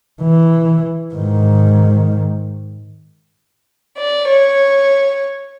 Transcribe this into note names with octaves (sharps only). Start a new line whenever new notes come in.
E3
G#2 D#3
D5
C#5